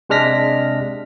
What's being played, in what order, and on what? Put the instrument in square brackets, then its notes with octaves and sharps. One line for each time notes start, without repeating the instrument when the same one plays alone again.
[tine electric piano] C3 G#3 D4 F6 A#6 B6